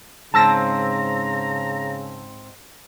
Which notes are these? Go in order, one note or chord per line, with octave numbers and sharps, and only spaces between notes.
G#2 C#3 C4 A5 A#5 E6 A#6